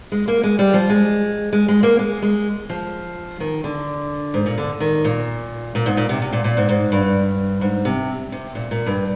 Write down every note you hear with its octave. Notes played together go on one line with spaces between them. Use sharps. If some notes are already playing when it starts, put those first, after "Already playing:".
G#3
A#3
G#3
G3
F3
G#3
G#3
G#3
A#3
G#3
G#3
F3
D#3
D3
G#2
A#2
D3
D#3
A#2
A#2
G#2
A#2
C3
C3
A#2
A#2
G#2
G#2
G2
G#2
C3
C3
A#2
A#2
G2